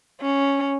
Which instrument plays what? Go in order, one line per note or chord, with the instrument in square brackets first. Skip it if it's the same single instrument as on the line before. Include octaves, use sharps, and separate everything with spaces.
[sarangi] C#4